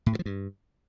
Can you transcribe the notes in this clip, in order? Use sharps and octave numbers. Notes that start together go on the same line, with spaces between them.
A2
G2
F3
G2